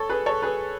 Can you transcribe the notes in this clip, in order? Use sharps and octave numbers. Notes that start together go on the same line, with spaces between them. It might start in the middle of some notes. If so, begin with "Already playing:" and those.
Already playing: A4 C#5
G#4 B4
A4 C#5
G#4 B4